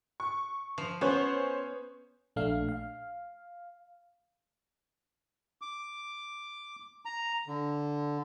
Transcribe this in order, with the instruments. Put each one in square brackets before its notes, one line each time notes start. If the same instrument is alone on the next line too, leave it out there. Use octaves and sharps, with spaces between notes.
[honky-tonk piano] C#6
[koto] F3
[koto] B3 [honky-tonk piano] C#4 C5 C#5
[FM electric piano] A#1 A3 D4 F5
F5
[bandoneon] D6
A#5
D3